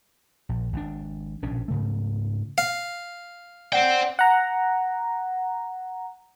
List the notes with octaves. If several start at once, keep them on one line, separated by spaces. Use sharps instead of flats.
A#1
G#1 D4
A#1 B2 C#4 D4
G#2 C#3 A3
F5
C5 D5 F#5 G5
F#5 A#5